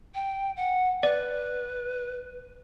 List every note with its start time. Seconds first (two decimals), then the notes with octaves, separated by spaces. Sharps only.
0.15 G5
0.57 F#5
1.03 B4 D5